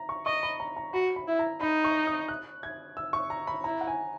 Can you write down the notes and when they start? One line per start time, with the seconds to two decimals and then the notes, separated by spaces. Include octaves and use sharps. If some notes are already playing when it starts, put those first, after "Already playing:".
Already playing: A#5
0.09 C#6
0.26 D#5 C#6
0.43 B5
0.60 A#5
0.76 A#5
0.93 F#4 B5
1.16 B5
1.27 E4
1.39 A#5
1.61 D#4 B5
1.84 C#6
2.07 D#6
2.28 F#6
2.63 G#6
2.97 E6
3.13 C#6
3.30 A#5
3.47 B5
3.64 E4 A#5
3.81 F#5
3.87 G#5